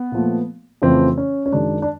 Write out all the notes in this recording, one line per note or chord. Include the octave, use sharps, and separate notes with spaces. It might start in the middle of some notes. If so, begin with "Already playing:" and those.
Already playing: B3
A#2 F3 A3
F2 C#3 E3 A3 C4
C#4
C#4
F#2 D#3 G#3 D4
D4